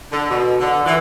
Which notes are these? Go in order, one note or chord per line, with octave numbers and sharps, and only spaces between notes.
D3
B2
D3
E3